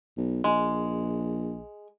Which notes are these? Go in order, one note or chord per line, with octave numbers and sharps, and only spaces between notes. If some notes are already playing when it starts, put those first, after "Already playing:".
B1
A#1 G#3